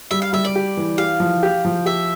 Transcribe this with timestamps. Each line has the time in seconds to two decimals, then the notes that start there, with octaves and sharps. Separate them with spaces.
0.11 G3 E5
0.22 F5
0.33 G3 E5
0.45 D5
0.56 G4
0.77 E3
0.98 G4 F5
1.20 F3
1.43 G4
1.65 F3
1.86 G4 E5